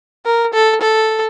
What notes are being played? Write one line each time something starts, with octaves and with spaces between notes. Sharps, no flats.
A#4
A4
A4